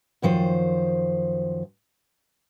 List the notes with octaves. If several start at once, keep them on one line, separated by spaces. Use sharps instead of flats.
F#2 D#3 F3 C5